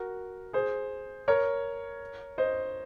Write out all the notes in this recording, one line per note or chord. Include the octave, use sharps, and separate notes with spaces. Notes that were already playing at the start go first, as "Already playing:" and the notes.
Already playing: F#4 A#4
G#4 C5
A#4 C#5
C5 D#5